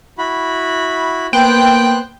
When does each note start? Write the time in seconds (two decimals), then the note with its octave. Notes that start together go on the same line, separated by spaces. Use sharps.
0.18 E4 F#4 B5
1.33 A#3 B3 C5 G5 F#6